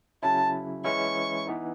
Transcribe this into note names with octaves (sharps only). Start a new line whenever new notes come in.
C#3 F#3 C#4 E4 A5
E3 G#3 C#4 E4 C#6
E3 B3 D#4